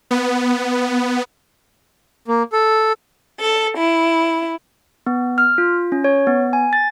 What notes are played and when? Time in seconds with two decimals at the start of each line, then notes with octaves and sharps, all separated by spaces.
0.11 B3
2.28 A#3
2.53 A4
3.38 A4
3.77 E4
5.07 B3
5.38 F6
5.58 F4
5.92 C#4
6.04 C#5
6.27 B3
6.53 G#5
6.73 A6